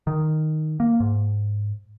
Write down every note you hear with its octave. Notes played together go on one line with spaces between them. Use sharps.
D#3
A#3
G#2